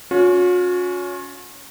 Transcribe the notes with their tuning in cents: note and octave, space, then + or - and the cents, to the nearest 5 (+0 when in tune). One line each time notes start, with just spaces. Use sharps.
C#4 +20 F#4 -45